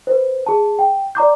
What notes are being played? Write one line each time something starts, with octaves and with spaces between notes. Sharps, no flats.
B4 C5
G#4 A5
G5
D5 A#5 D6 G6